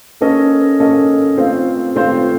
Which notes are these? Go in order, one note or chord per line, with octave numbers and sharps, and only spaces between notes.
A#3 C#4 A4 D#5
A#3 C#4 A4 D#5
A3 C4 F4 C5 F5
A3 C4 F4 C5 F5